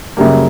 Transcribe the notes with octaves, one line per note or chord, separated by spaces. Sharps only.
F#2 C#3 G3 A#3